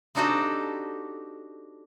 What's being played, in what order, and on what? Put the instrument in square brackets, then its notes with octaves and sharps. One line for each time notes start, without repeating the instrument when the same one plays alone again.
[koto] C4 D4 D#4 F#4 G4 A4